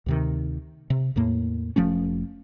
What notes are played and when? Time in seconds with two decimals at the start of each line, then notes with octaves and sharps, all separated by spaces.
0.06 D2 C3 D#3
0.90 C3
1.16 E2 A2 A#3
1.76 F1 F3 A3 C#4